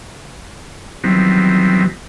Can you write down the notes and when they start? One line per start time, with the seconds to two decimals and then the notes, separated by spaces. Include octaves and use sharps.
1.04 D#3 E3 F#3 G3 B3 C4